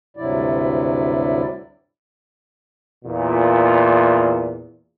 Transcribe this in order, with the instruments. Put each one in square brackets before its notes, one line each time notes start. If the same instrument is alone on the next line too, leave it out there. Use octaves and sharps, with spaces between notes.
[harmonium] D2 G2 C3 F#3 E4 D5
[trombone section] E2 A#2